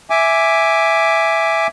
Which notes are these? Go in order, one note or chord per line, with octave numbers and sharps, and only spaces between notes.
E5 G#5 D6